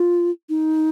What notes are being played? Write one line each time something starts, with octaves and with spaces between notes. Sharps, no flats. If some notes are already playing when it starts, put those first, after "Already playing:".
Already playing: F4
D#4